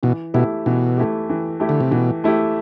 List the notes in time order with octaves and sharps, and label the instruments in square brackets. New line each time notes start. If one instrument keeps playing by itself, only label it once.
[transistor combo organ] B2 [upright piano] E3
[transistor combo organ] B2 [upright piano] A3 E4 G4
[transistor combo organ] B2 [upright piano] E3
[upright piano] A3 E4 G4
E3
A3 E4 G4
[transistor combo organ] D3
C3
[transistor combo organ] B2 [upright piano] E3
[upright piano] A3 E4 G4